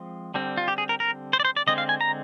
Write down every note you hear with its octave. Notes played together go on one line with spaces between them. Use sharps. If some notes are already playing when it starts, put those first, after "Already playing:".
Already playing: F3 G#3 C4
D3 G3 C4
F4
G4
G#4
A#4
A#4
C5
D5
C5
D5
D3 G#3 C4 D#5
F5
G#5
A#5